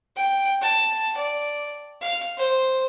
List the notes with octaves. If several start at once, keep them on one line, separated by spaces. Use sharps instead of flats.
G5
A5
D5
F5
C5